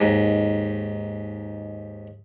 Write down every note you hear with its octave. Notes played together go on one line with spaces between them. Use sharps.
D#2 G#2